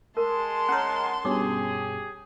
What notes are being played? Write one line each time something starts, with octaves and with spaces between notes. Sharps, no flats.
G#3 A#4 A5 C6
C#4 A#4 C#5 F#5
G2 B2 C#4 G4 G#4 D6